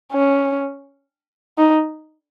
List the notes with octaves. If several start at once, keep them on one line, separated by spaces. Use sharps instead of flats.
C#4
D#4